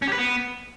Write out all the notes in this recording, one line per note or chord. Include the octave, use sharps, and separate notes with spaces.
C#4
G4
B4
B3